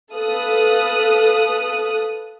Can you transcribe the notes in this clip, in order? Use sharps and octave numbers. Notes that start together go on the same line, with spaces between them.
A4 B4 F5 D#6 F#6